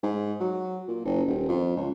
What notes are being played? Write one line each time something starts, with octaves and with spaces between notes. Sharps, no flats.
G#2
F#3
A#2
F#1
D#1
F2
C#2